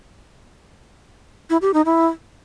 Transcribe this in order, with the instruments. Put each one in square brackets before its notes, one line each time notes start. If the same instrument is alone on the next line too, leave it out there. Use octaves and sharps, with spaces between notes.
[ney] E4
G4
D#4
E4